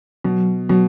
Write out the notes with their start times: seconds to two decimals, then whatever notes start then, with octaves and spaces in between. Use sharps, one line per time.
0.24 B2 F#3
0.69 B2 F#3